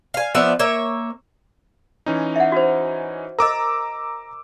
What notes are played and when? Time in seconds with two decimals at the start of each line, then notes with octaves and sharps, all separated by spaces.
0.14 F5 G#5
0.35 F3 B3 D4 E5
0.59 A#3 C#5 E5
2.06 E3 C#4 D#4
2.36 E5 F#5
2.52 F#4 C5
3.39 A#4 D#5 A#5 D6 E6